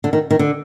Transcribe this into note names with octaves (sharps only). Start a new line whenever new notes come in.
D3
D#3
D#3
D3